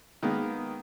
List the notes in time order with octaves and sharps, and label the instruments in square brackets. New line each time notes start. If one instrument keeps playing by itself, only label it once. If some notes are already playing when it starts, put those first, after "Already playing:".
[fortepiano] D#3 G#3 A#3 B3